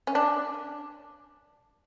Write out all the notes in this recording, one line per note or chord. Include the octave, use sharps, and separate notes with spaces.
C#4
D4